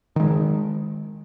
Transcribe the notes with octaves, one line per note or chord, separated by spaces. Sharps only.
D#3 G#3